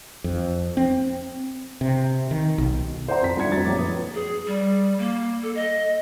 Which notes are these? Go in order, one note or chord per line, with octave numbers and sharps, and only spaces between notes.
F2
C4
C3
D#3
B1
C5 D5 E5 F#5 A#5 C6
F2 B6
G1 F3 D4 G#6 C#7
F1 F#4 A#5 A6
A#1 F#2 F4 D6
B4 D#6
G#4
G3
A#3
A4
D#5